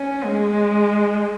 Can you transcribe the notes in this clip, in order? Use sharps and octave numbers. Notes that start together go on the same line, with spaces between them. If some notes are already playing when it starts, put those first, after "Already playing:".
Already playing: C#4
G#3